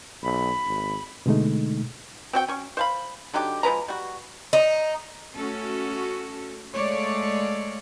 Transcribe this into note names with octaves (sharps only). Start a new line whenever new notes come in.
B1 B5
G#1
B2 D3 G#3 A3 D#4
C4 F#4 G5
C#4 C#6
C5 F5 B5
D3 F#3 D#4 G4
F3 G#3 B4 A#5
G3 F#4
D#4
A3 C#4 F#4 A4
G#3 A3 A4 C#5 D5 F5